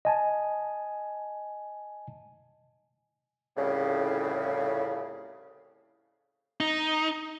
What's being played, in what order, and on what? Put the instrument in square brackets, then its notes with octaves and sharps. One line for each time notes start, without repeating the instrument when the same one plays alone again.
[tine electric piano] D#5 G#5 A5
[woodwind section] C2 F2 A2 C#3
[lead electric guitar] D#4